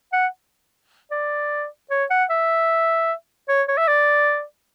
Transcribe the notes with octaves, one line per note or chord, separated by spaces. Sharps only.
F#5
D5
C#5
F#5
E5
C#5
C#5
E5
D5